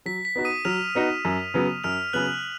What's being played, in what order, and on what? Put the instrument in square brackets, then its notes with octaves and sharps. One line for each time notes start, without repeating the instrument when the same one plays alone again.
[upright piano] F#3 [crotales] B6
[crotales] B6
[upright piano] B3 D#4 F#4
[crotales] D#6 D#7
[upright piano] F#3 [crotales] F6 F7
[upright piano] B3 D#4 F#4
F#2
C#3 F#3 B3
[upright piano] F#2 [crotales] F6 F7
[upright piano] C#3 F#3 B3 [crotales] F#6 F#7